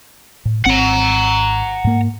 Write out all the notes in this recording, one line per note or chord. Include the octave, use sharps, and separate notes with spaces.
A2
G#1 C4 F#5 A#5
G#2 A#3